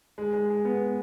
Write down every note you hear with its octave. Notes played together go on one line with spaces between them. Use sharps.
G#3
G#3
G#3
B3